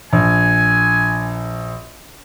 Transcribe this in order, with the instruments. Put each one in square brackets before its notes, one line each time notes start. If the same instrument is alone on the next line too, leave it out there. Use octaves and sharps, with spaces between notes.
[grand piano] A#1 [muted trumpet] G#5